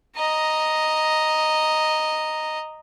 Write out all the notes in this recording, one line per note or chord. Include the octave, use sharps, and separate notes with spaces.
D#5 A#5